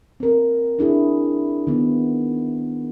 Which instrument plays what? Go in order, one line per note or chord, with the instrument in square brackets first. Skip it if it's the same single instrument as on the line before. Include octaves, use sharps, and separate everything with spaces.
[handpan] C4 A#4
D4 E4 G#4
D#3 B3